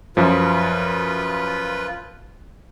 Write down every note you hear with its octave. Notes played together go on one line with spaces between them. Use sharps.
F#2 F3 F4 B4